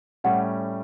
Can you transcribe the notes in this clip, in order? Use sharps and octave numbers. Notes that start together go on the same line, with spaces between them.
A2 G3 C#4 F#5